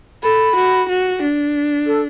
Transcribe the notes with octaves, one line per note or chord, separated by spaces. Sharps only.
A4 B5
F#4
F#4
D4
A4